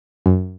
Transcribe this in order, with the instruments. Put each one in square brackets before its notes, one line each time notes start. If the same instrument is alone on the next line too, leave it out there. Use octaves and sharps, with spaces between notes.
[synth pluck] F#2